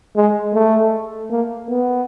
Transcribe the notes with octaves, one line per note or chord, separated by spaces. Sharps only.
G#3
A3
A#3
B3